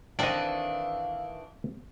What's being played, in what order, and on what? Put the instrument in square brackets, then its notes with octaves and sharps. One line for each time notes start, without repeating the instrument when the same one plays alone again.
[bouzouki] D#3 E3 D4 [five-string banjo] C4 A4 [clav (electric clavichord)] D5 D#5 [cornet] F5